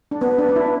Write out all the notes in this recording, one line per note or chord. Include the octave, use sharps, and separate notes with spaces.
D4
B3 B4
D4
D4
E4